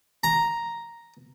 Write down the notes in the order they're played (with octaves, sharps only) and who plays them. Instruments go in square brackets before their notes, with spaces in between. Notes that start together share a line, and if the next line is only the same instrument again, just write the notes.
[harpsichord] A#5